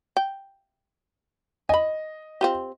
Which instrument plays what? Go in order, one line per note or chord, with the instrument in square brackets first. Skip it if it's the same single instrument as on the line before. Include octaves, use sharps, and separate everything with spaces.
[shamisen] G5
[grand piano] D#5 [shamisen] G#5 B5
[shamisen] C4 F4 G4